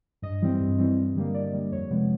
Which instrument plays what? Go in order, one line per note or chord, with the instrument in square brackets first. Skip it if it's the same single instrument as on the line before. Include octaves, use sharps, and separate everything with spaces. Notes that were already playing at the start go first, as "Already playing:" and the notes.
[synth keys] G2 D#5
E3 G3 C4
G2
E3 G3 C4
G2
D3 G3 A#3
G2 D5
D3 G3 A#3
F2 C#5
C3 F3 G#3 B3